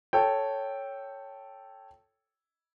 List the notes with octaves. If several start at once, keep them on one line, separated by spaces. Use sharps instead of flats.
A4 C#5 G5